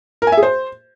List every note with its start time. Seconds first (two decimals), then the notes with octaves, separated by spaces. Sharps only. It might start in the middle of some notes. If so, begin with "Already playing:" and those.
0.22 A#4
0.27 G#5
0.32 E5
0.37 G#4
0.43 C5